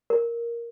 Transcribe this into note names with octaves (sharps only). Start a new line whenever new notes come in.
A#4